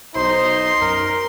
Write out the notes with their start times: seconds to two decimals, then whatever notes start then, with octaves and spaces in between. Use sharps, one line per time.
0.16 B1 D#4 C5 C6
0.81 F#2 A#4